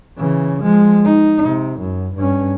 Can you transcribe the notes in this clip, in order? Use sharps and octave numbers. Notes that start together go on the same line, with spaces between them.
C#3 E3
F3 G#3
D#4
C3
F#2
G2 C#4